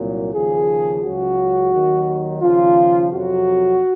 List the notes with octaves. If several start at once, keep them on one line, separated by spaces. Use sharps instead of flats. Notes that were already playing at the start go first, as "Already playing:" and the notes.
Already playing: C2 A#2 F#3
D#2 C#3 F3 G#4
C#2 C#3 F#3 F#4
D#2 D#3 F#3
D#2 C#3 F3 F4
F2 C3 F#3 F#4